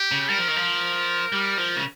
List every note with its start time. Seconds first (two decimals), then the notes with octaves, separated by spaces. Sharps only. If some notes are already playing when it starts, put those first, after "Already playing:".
Already playing: G4
0.12 C#3
0.28 G3 A#4
0.38 F3
0.48 D#3
0.56 F3
1.33 G3
1.58 F3
1.76 C#3